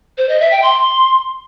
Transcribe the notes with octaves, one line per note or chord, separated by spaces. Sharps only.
C5
D#5
E5
G5
C6